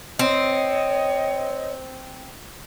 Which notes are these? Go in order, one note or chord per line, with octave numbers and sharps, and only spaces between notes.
C4 C#5 D#5